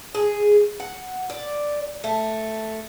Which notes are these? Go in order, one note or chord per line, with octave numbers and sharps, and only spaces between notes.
G#4
F#5
D5
A3